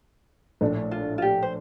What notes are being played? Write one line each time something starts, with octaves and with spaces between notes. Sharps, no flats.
A#1 A2 A3 D4
F4
F4
G4
C5